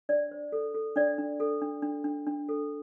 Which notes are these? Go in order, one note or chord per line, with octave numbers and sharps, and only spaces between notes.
D4 D5
C5
A4
A4
D4 D5
D4
A4
D4
D4
D4
D4
A4